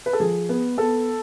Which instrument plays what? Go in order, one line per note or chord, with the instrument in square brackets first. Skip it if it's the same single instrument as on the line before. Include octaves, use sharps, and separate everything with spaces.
[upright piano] B4
A4
F3 G#4
B3
B3 A4